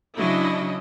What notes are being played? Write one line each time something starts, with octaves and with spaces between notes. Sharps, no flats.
C#3 F#3 D4 E4 D#5